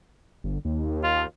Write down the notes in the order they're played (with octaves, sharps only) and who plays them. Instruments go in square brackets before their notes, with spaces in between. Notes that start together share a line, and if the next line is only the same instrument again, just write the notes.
[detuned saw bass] G1
D#2
[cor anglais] F4